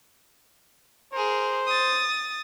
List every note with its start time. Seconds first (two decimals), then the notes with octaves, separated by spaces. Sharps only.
1.13 G#4 A#4 C5
1.67 D#6 A6